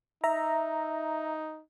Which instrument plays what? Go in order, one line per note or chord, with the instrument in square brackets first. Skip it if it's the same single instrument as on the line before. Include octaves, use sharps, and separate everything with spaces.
[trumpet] D#4 [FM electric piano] E5 A#5